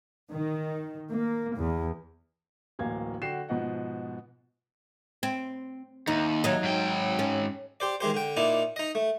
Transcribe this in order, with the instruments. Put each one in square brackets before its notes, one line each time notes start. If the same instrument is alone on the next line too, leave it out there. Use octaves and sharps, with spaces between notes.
[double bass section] D#3
A#3
E2
[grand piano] D1 A1 A#3 F5 G#6
D3 F#4 G5 C7 E7
G#2 B2 F3 D#5 F#5
[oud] C4
[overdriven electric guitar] D#2 [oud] D#4
[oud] F#3 D#4
[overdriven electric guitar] G#2 G5
[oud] C#4
[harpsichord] G4 C5 D5
D#3 G#3 G4 C5
D3 G5
A#2 D#4 E4 D5
D#4 D#5
A3